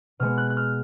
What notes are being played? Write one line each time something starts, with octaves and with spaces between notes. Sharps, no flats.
B2 G#3 B3 F6
F#6
F#6
F6